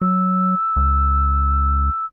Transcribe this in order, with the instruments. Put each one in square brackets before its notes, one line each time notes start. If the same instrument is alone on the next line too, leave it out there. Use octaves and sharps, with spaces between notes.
[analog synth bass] F#3 [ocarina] E6
[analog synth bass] C#2